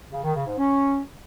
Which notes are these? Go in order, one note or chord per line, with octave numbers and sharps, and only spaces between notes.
C#3
D#3
C#3
G#2
C#4